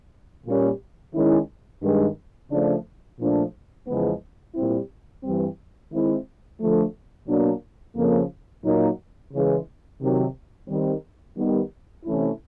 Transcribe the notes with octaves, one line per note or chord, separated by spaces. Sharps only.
A#2 G3 A#3 C#4
D#3 G#3 C#4 E4
G2 D#3 G#3
C#3 F3 A3 D4
A#2 F3 A3 D4
E2 C#3 F3 G#3 B3
A#2 G3 C4 E4
G2 E3 G3 C4
D#3 G#3 C4 E4
D3 F3 A3
B2 F#3 A#3 D4
F2 C#3 F3 A#3
A#2 F#3 A#3 D#4
C#3 E3 G#3
C3 D#3 F#3
D#3 G3 C4
D#3 G3 B3
C3 E3 A3 C#4 E4